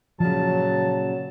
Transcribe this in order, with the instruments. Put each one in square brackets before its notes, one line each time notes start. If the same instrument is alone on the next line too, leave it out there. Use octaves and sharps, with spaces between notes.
[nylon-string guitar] A#2 C#3 [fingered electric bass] F3 [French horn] F#3 [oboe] A5